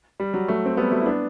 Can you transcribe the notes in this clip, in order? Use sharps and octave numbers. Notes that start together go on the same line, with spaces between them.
G3
F#3
F#3 A3
C4
G3 B3
F#3 A3
E4
B3 D4